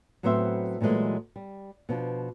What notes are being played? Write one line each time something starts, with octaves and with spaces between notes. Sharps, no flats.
A2 F#3 B3 C4 C5 E5
A#2 E3 F#3 G#3 A3
G3
B2 F3 D4